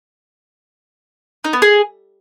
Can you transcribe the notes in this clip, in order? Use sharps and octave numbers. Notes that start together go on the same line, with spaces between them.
D#4
B3
G#4